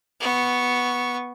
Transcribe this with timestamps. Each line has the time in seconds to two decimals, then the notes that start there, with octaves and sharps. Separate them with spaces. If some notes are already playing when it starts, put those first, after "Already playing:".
0.21 B3 C#6